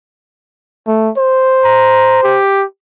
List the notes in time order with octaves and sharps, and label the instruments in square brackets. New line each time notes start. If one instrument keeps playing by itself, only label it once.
[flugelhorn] A3
C5
[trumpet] A#5
G4